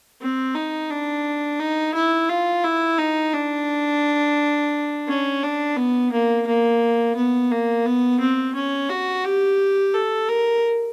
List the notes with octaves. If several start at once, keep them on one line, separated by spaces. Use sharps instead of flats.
C4
D#4
D4
D#4
E4
F4
E4
D#4
D4
C#4
D4
B3
A#3
A#3
B3
A#3
B3
C4
C#4
F#4
G4
A4
A#4